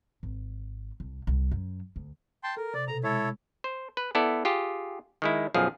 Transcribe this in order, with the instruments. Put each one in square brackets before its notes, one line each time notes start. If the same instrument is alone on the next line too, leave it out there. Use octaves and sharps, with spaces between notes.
[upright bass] G#1
C2
C2
F#2
D2
[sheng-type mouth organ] G5 A5 C6
[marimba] A4 [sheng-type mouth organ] A#4
[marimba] C3 [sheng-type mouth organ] D5
[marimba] B2 A4 [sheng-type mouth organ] A#5
[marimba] G#3 [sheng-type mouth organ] E4 A4 C#5
[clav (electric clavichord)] C5
B4
B3 E4 A4 D5
F4 G4 G#4
D#3 G#3 E4
B1 F#2 F3 G#4 F5